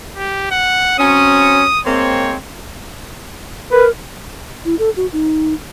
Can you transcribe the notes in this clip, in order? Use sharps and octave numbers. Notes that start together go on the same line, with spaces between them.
G4
F#5
F#3 C4 C#4 D#6
G#3 A#3 C4 C#5
A#4 B4
E4
A4
F#4
D#4